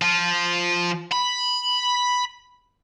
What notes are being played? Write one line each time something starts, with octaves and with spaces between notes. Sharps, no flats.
F3
B5